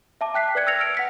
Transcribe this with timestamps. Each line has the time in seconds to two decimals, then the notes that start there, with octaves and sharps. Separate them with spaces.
0.21 E5 A5 D6
0.34 G5 F#6 B6 C7
0.55 B4 D5 F#6 G#6 C#7
0.67 E6 F6 G#6 A#6 C#7 F7
0.79 E6 F6 D7
0.95 F#5 B6 C#7